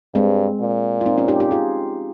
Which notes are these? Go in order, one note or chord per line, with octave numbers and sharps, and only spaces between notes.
G2 G#3 C4
A#2
F4
C4 D#4
C#4 F4
D#4 G4
D#4 G4
F4 G#4